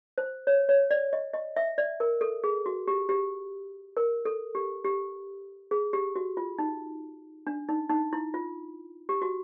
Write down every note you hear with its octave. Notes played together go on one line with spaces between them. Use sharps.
C5
C#5
C#5
D5
D#5
D#5
E5
D5
A#4
A4
G#4
F#4
G4
G4
A#4
A4
G4
G4
G#4
G4
F#4
F4
D#4
D4
D#4
D#4
E4
F4
G4
F#4